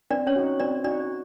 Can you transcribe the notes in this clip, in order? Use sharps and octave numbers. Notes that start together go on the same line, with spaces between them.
C4 D4 D5
C#4 C#5
D#4 F#4
C4 D4 D5
D4 D#4 F#4 D5